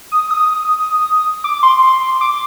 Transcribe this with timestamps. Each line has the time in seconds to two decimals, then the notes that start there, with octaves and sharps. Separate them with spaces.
0.12 D#6
0.31 D#6
1.44 D6
1.63 C6
1.82 C6
2.21 D6